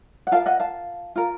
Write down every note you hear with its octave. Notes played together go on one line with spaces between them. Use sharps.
F#5
F4 A#4 F5 A5
D#5 F#5
F5 A5
F4 A#4